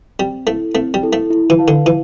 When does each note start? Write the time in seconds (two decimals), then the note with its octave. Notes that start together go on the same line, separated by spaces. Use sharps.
0.19 G3 C4
0.47 A3 E4 A4
0.75 A3 C4
0.94 G3
1.03 E4 A4
1.13 A3
1.30 E4
1.50 E3
1.59 B4 F5 A5
1.68 D3
1.86 E3 E4